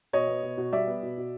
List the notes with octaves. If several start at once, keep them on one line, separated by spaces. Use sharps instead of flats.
B2 C#5 D#5
B3
B2
B2
G3 D5 E5
B3
B2
B2